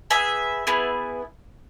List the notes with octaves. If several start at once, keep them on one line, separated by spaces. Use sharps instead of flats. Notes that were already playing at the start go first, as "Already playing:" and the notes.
B3 G#4 E5
B3 E4 G#4